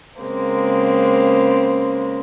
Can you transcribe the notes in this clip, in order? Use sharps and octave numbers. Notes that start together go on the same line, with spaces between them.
C#3 G#3 A#3 C4